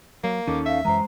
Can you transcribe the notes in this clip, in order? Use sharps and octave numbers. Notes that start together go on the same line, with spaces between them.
F#3 A#3
D#2 D#3 C#4 D#4 A4 D6
E5 F5
F#2 E3 G#3 C5 A#5